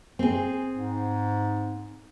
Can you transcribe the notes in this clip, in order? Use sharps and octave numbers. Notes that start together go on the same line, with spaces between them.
C4 G#4
G#2